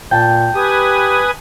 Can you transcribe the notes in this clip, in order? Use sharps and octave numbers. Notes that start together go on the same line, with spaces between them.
A#2 G5 A5
G4 B4 G#5 D#6